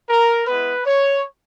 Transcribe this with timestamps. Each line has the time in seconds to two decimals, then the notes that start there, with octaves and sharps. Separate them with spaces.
0.10 A#4
0.47 G#3 B3 E4 B4
0.85 C#5